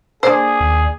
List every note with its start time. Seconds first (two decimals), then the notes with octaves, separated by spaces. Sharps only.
0.23 D3 A#3 G#4 C5 D5
0.60 D#2